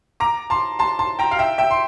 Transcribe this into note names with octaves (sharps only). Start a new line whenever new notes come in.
A#5 D6
A5 C6
A5 C6
A5 C6
G5 A#5
F5
E5 G5
E5 G5
C6